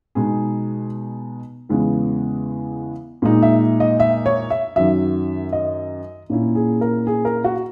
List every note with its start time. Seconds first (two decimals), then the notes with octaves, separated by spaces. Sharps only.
0.15 B2 G#3 B3 D#4 G#4
1.69 E2 C#3 G#3 B3
3.22 A#2 G#3 D#4
3.42 E5
3.80 D#5
4.00 E5
4.26 C#5
4.50 E5
4.76 F#2 D#3 F#3 E5
5.53 D#5
6.30 A#2 A#3 C#4 E4
6.55 G#4
6.81 A#4
7.07 G#4
7.25 A#4
7.44 F#4